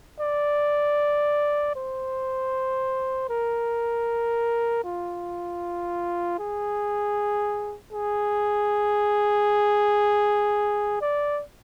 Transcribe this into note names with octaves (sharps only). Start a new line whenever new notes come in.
D5
C5
A#4
F4
G#4
G#4
D5